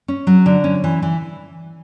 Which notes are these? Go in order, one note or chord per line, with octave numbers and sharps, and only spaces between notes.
C#4
F#3
D3
C#4
E3
E3